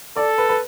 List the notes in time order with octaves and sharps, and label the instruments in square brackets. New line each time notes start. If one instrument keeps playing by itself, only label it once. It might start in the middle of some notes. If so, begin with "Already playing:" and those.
[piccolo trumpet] A4 [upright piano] D5
[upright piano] B4
B4